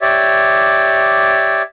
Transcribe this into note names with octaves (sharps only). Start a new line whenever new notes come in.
G4 C#5 D5 E5